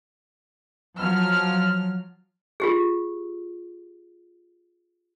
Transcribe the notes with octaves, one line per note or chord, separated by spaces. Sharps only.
F3 F#3 F6
F4 G4 G#4